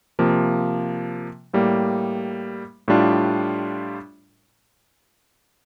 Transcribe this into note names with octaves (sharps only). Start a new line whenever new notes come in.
C3 F3 A#3
A2 G3 A#3
A2 G3 D4 F4